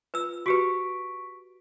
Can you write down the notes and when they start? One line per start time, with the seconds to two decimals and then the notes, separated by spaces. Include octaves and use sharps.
0.14 F4 B4 E6
0.46 F#4 G4 B4 C#6 B6 D7